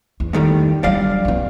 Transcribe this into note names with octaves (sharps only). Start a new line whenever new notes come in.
E2
A2 D#3 G3
G2 F#3 G3 D5 F5
B1 B3